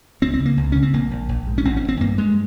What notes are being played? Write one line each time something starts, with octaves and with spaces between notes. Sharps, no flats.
C#2 C4
C4
C#3
A#3
C#2
C#3 C#4
C4
A#1 A#3
A#1
A#1
G#2
C#4
G#1 C4
C#4
G2
C4
G2 A#3
G2 G#3